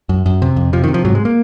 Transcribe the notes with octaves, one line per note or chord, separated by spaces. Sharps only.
F#2
F#2
C3
F2
C3 F3
D#3
C3
F3
G#2 F#3
G#3
A#3